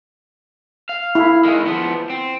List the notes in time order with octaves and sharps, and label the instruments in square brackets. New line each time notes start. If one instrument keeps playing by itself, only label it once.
[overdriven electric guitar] F5
[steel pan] E4
[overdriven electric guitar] D#3 G#3
F3 B3
C4